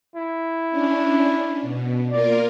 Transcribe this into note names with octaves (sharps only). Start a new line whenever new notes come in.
E4
C#4 D4
B2
A#3 F4 A#4 D5